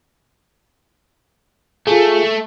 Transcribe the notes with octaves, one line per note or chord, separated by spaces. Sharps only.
A3 F4 G#4